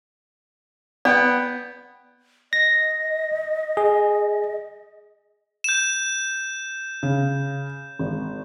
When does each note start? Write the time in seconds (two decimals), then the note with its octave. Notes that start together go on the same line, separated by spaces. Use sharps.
1.05 B3 D5 G5
2.53 D#5 A#6
3.77 G#4
5.64 G6 E7
7.03 C#3
7.99 G#1